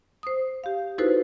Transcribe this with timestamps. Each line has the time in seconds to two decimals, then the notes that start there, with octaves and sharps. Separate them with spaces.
0.23 C5 D#6
0.64 G4 F5
0.98 D#4 E4 F#4 A4 B4 C5